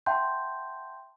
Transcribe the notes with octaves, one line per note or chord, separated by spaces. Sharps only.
E5 F#5 G5 A5 C6 G6